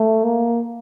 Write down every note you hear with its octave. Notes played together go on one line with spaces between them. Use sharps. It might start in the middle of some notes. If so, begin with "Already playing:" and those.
Already playing: A3
A#3